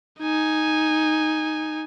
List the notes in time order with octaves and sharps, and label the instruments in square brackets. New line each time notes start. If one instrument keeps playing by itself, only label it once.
[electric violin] D#4 G#5